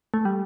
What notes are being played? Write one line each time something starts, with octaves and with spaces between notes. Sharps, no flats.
A3
G3